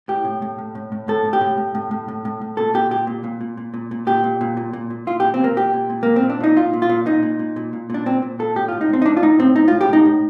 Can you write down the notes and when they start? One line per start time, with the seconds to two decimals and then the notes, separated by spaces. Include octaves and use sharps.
0.08 A2 G4
0.25 A2
0.42 A2
0.59 A2
0.75 A2
0.92 A2
1.08 A2 A4
1.25 A2
1.33 G4
1.41 A2
1.57 A2
1.75 A2
1.91 A2
2.08 A2
2.25 A2
2.41 A2
2.57 A#2 A4
2.74 A#2 G4
2.91 A#2 G4
3.07 A#2
3.24 A#2
3.41 A#2
3.57 A#2
3.74 A#2
3.91 A#2
4.07 A#2 G4
4.24 A#2
4.41 A#2
4.57 A#2
4.73 A#2
4.90 A#2
5.07 A#2 F4
5.20 G4
5.24 A#2
5.34 C4
5.40 A#2 A#3
5.56 A#2 G4
5.74 A#2
5.90 A#2
6.03 A#2 A#3
6.16 C4
6.23 A#2
6.30 D4
6.41 A#2 D#4
6.56 A#2 F4
6.73 A#2
6.82 F4
6.89 A#2
7.06 A#2 D#4
7.23 A#2
7.39 A#2
7.56 A#2
7.73 A#2
7.90 A#2 D4
8.06 A#2 C4
8.22 A#2
8.39 A#2 A4
8.55 A2 G4
8.68 F4
8.72 A2
8.81 D#4
8.90 A2 C4
9.02 D#4
9.06 A2 D4
9.17 F4
9.22 A2 D#4
9.39 A2 C4
9.55 A2 D#4
9.68 F4
9.72 A2
9.81 G4
9.89 A2 D#4
10.05 A2